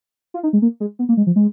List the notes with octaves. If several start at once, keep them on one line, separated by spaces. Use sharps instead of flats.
F4
D#4
G#3
A#3
G#3
B3
A#3
G#3
F3
G#3